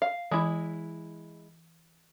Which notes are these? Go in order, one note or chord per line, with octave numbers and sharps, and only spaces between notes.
F5
E3 G#3 E4